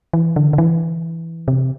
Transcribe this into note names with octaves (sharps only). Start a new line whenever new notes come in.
E3
D3
D3
E3
C3